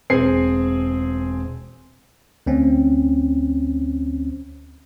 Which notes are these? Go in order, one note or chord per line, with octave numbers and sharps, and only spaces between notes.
E1 C4 G#4 G#5 C7
D2 C4 C#4